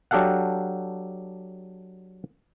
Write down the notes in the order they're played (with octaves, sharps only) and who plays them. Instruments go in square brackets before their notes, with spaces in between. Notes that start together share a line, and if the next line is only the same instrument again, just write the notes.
[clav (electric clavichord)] F#3 D4 G4 A4 F5 F#5